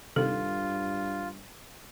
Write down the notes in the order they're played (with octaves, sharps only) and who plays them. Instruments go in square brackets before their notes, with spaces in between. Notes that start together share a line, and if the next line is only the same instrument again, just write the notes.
[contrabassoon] G2 [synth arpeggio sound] C3 D#3 [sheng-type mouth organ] F4 [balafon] A4